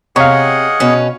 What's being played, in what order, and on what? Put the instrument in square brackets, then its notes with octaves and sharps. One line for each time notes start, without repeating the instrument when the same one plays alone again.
[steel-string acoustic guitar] C3 [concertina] G#4 D#5 F#5 [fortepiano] C#5 F5
[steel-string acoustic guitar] B2 C#4 B4